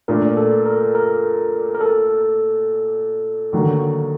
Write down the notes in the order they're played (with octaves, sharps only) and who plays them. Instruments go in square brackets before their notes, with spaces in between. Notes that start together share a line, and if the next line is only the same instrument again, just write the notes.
[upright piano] A#2 A3 D4 [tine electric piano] A#4
[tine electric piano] A4
A#4
A#4
A#4
A4
[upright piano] D#2 D3 F#3 A#3